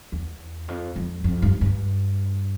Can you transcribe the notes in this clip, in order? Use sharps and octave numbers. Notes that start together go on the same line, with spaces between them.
E2
F2
F2
F2
G2
G2